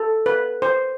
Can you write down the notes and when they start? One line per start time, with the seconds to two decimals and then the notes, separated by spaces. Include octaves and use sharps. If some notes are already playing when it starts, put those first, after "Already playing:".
Already playing: A4
0.26 B4
0.62 C5